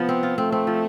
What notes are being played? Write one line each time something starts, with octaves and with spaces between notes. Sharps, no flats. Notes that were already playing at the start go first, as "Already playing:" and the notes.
Already playing: C3 F3 B3
C4
F4
A3 C4
C4
F3